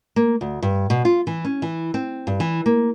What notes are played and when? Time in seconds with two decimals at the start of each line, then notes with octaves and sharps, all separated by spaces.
0.16 A#3
0.41 D2
0.63 G2
0.90 B2
1.05 F4
1.27 E3
1.45 C#4
1.62 E3
1.94 C4
2.27 G2
2.40 E3
2.66 A#3